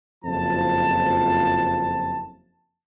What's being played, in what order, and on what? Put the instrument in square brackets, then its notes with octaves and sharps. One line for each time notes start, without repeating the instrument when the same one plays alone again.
[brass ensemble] F#1 F2 F3 A5